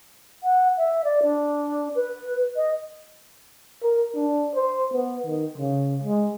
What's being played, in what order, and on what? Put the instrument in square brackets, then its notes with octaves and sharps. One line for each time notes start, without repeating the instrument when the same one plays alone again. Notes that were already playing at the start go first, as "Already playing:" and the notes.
[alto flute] F#5
E5
D5
D4
B4
D#5
[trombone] A#4
D4
C5
B3
D#3
C#3
G#3